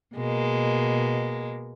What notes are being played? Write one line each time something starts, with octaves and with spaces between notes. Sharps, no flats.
B2 G#3 A#3